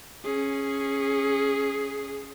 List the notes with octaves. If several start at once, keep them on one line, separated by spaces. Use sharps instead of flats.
C#4 G#4